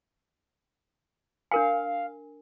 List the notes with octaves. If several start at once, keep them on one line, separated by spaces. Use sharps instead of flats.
D4 A#4 F5 G#5